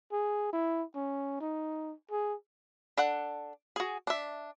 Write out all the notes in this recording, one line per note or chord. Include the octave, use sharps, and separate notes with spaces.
G#4
E4
C#4
D#4
G#4
D4 A4 F#5
F#4 G#4
D4 E5